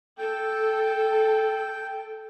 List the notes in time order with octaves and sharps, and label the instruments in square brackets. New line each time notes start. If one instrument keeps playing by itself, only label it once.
[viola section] A4 [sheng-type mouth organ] G5